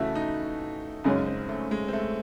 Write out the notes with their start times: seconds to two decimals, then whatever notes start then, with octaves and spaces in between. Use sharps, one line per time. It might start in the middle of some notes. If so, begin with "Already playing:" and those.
Already playing: C#3 E3 A3 E4 F#4
0.15 D#4
1.04 F#2 C#3 G#3 C#4 D#4
1.26 C4
1.49 A3
1.71 G#3
1.88 C4
1.93 A3